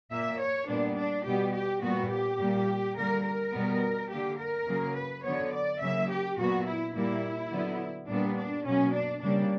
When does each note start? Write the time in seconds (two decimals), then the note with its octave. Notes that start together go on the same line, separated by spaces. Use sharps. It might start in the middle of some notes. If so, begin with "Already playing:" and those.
0.11 A#2 A#3 E5
0.40 C#5
0.68 A#2 G3 B3 D4
0.97 D4
1.25 B2 G3 B3 G4
1.54 G4
1.82 A#2 G3 B3 F#4
2.10 G4
2.39 A#2 G3 A#3
2.96 D3 G3 A#3 A#4
3.25 A#4
3.53 B2 G3 B3
4.10 D3 A#3 G4
4.39 A#4
4.67 C#3 F#3 A#3
4.96 B4
5.24 D3 F#3 B3 C#5
5.53 D5
5.81 C#3 F#3 A#3 E5
6.09 G4
6.38 A#2 F#3 B3 F#4
6.66 E4
6.95 A#2 G3 A#3 E4
7.51 D3 F#3 B3
8.09 A#2 G3 B3 D4
8.37 D4
8.65 B2 F#3 A#3 C#4
8.94 D4
9.22 C#3 G3 A#3 D4